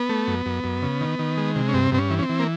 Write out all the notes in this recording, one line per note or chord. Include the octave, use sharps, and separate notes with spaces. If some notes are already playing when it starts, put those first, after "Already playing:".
Already playing: B3
A3
F#2
F#2
F#2
C#3
D#3
D#3
G#3
C3
C#4
G2 C4
G2 C4
C#4
E3
C#4
C4
E3
A#3